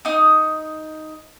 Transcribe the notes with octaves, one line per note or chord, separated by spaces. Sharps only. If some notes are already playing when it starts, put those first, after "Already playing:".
D#4 D#6